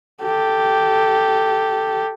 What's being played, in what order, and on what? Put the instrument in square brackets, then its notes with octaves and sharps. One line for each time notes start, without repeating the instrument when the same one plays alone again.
[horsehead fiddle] G4 A4